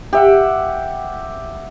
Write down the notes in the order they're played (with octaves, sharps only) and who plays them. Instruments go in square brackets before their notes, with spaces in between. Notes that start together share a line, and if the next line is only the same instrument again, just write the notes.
[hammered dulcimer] G4 E5 F#5